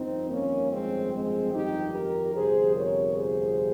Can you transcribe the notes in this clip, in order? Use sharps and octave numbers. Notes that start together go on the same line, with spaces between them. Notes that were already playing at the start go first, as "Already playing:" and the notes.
Already playing: G1 F2 D#3 C4 D#4
A#3 C#4
G#3 C4
G#3 C4
D#4 G4
G4 A#4
G1 F2 C3 G#4 C5
A#4 C#5
G#4 C5